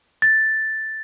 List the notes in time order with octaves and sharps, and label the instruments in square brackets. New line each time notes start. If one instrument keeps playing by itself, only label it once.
[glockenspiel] A6